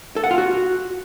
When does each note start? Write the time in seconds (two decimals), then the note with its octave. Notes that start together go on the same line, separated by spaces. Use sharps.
0.16 A4
0.24 F#5
0.31 F4
0.38 F#4